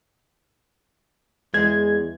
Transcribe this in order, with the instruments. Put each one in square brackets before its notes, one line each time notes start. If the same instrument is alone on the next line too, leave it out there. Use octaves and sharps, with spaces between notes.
[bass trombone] E2 [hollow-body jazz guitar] G#3 [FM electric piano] G#6